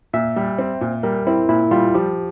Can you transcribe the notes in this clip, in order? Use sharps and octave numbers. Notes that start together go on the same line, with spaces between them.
A#2 E5
G3
C4
A#2
G3 A#4
C4 E4
A#2 E4
G3 F4
F3 G4